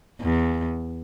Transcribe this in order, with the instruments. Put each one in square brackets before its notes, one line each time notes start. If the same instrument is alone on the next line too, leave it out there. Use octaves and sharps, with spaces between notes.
[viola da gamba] E2